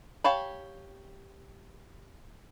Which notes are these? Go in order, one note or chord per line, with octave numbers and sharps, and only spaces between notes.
G4 C#5 F5 A5 B5